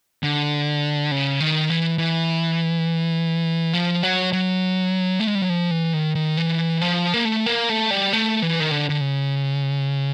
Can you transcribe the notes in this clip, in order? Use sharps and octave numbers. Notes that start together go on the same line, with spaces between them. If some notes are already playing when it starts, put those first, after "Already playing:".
D3
C#3
D#3
E3
E3
F3
F#3
F#3
A3
G#3
G3
F#3
F3
E3
D#3
D#3
E3
F3
A#3
A3
A#3
A3
G3
A3
E3
D#3
D3
D3
C#3